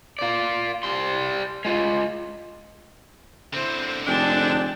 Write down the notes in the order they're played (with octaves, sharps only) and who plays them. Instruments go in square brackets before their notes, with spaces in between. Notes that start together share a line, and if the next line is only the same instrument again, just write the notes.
[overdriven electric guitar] F4 D5
G3 C6
G#3 F4
[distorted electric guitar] D3 C4 [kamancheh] E4 C5
[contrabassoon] F1 [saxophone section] G#3 D4 [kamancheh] G5 A5